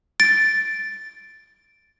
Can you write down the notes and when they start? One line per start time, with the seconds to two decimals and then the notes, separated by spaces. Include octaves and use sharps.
0.20 A6 D7